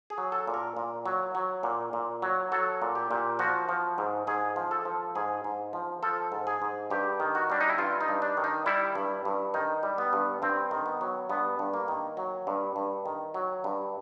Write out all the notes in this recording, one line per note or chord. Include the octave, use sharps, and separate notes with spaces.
G#4
F#3
A4
A#2
A#4
A#2
F#3
F#3
A#2
A#2
F#3
F#3 A4
A#2
G4
A#2
F3 F#4
F3
G#2
G#2 G#4
F3
A4
F3
G#2 G#4
G#2
F3
F3 A4
G#2
G#4
G#2
G2 G4
D#3
F#4
G3 D4
D#4
E4
G2 F4
D#4
G2
D4
D#3
D#4
G3 E4
G2
G2
D#3 D#4
G3
B3
G2
G2 C4
D#3
B3
F#3
G2 B3
G2
A#3
D#3
F#3
G2
G2
D#3
F#3
G2